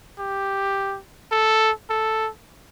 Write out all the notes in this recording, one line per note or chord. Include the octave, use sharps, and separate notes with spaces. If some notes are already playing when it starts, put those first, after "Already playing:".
G4
A4
A4